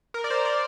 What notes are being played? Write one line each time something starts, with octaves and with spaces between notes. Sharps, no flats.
A#4
D5
C5
D5